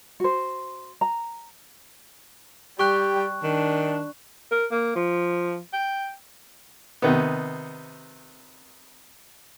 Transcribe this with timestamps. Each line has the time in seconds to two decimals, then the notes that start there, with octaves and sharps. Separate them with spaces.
0.20 F#4 C5
1.01 A#5
2.79 G3 G4 C#6 F#6
3.43 D#3 D4
4.52 A#4
4.72 A#3
4.96 F3
5.73 G5
7.02 C3 D#3 B3